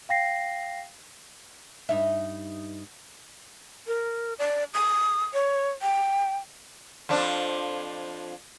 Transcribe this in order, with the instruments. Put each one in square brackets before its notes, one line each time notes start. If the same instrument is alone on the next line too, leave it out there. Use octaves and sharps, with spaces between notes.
[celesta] F5 G5 A#6 C7
[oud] G2 D#4 E5
[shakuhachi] A#4
D5
D#6
C#5
G5
[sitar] F2 F3 D4